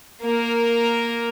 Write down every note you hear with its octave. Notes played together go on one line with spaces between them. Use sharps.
A#3 A#4